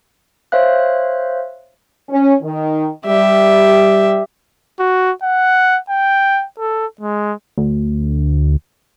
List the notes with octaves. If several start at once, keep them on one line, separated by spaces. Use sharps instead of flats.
C5 C#5 E5 F5 F#6
C#4
D#3
G3 G4 E5
F#4
F#5
G5
A4
G#3
D2